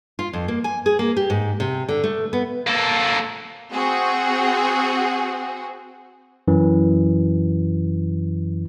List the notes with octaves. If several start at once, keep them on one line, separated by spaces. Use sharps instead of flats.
F4
F2
A#3
G#5
G#4
A#3
G4
G#2
C3
D3
A3
B3
A#3 A4
C4 F#4 G#4
F#2 E3